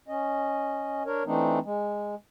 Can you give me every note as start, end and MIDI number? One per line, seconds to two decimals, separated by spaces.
0.08 1.03 61
0.08 1.03 75
1.06 1.23 62
1.06 1.23 70
1.06 1.23 73
1.26 1.59 52
1.26 1.59 57
1.26 1.59 60
1.26 1.59 62
1.26 1.59 63
1.64 2.15 56